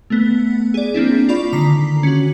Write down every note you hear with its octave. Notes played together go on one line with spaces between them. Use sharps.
A3 B3
G#4 D5
A#3 C4 D4 E4
F4 D5 B5 C#6
D3 D#3 A#5 B6 C7
C#4 F#4